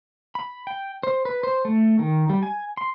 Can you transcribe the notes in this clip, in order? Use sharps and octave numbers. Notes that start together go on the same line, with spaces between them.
B5
G5
C5
B4
C5
A3
D#3
G3
G#5
C6